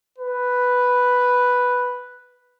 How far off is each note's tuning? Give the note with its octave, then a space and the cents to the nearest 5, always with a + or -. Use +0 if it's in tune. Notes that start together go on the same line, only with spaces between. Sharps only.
B4 +0